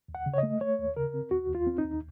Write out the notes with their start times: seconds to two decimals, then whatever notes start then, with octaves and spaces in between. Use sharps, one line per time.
0.08 D#2
0.15 F#5
0.26 C#3
0.34 C#5
0.38 D#5
0.43 A3
0.61 A3 C#5
0.79 D#2
0.96 C#3 A#4
1.14 C4
1.31 D#2 F#4
1.49 D#2
1.55 F4
1.67 C4
1.78 D#4
1.84 D#2